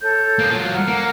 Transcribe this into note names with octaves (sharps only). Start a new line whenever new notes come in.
A4 C#5 G6
A#3 G#4
F#3 F4
F#5 A#5 F6
A#3